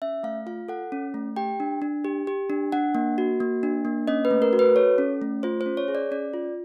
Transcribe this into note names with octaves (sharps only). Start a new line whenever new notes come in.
C#4 E5
A3 F5
F4 F5
A4 F#5
C#4
A3
G4 G5
D4
D4
G4
G4
D4
D4 F#5
A#3
F#4
A#3
D4
A#3
C#4 D#5
B4
A3
A#4
F#4
B4
A4 C#5
C#4
A3
F4 C5
C5
C#4
C#5
G#4
D5
C#4 D5
F4